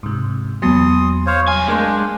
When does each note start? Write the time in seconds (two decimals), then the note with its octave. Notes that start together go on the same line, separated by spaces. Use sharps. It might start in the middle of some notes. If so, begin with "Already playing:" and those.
0.03 G#2 C3
0.62 E2 F#3 A#3 B3 C6 D#6
1.26 C5 C#5 F5
1.48 C2 F5 G#5
1.68 G#3 A3 D4 A#4 F5 G5 C6